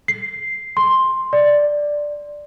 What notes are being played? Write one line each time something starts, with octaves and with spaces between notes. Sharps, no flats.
C7
C6
D5